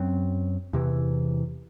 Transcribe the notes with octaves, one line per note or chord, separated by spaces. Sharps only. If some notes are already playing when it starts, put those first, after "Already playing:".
Already playing: F#2 F#3 C4
E2 C3 E3